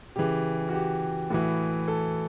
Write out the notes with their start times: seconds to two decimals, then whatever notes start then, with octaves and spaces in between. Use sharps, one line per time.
0.16 C#3 E3 G4
0.68 F#4
0.73 G4
1.30 A2 E3 F#4
1.88 A4